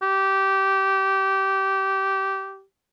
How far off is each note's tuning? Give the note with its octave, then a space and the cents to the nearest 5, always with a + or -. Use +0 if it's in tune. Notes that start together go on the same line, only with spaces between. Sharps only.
G4 -20